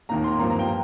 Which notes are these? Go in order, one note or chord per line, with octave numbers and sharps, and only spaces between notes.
D#2 D#3 A#3 A#5
C6
G2 F3 A#3 A#5
A#5
G5